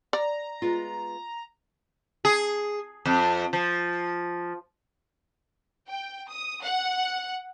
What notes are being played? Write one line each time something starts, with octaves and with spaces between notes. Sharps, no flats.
D5 A#5
G#3 B3 F4
G#4
F2
F3
G5
D#6
F#5